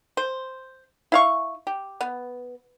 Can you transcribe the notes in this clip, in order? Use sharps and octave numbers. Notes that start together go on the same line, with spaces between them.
C5
E4 F5 C#6
G4
B3